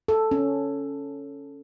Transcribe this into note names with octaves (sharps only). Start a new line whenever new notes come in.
A4
C#4